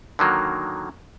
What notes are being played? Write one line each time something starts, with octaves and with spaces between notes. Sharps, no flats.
D3 D#3 F#3 A#3